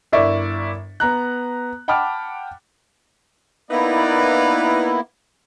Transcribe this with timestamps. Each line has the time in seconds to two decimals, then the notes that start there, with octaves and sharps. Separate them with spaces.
0.12 G1 E4 A#4 D5 E5 C#6
1.00 B3 A#5 F#6
1.88 F#5 G5 A5 B5 D6 F6
3.71 A#3 B3 D#4 E4 B4 D5